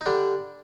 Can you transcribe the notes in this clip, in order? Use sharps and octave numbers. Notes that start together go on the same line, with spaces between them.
D#4
D3 G3 D4